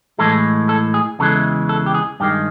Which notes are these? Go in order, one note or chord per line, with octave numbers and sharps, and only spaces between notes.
A2 E3 G#3 A4
A4
G#4
E2 C#3 E3 G#3 A4
A4
G4
G#4
G2 D#3 G#3 G4